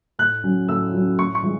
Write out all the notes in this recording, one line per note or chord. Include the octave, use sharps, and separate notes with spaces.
A2 F#6
F#3 C#4
A2 E6
F#3 C#4
A2 C#6
C#6
E3 G#3